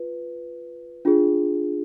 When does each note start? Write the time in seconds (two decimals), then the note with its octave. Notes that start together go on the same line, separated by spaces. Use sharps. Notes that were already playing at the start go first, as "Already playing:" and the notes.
Already playing: F4 B4
1.05 D4 F4 G#4